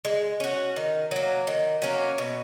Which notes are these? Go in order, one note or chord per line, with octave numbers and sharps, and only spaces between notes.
G#3
C#4 F#4
D#3
F#3 A#3
D#3
F#3 A#3 C#4
B2